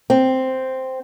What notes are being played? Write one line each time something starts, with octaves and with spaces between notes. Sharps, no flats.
C4